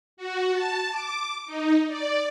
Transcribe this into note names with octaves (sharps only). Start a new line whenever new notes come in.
F#4
A5
D6
D#4
D5